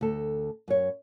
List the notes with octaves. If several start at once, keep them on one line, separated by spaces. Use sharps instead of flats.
D2 A4
F#2 C#5